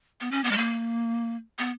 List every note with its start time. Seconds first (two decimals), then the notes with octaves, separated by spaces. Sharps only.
0.21 B3
0.31 C#4
0.44 B3
0.51 G#3
0.57 A#3
1.58 B3